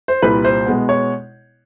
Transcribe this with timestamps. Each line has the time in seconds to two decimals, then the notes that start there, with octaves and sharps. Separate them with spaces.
0.08 C5
0.22 C2 A#2 G3 B4
0.44 C5
0.66 B2 G#3 B3
0.89 C#5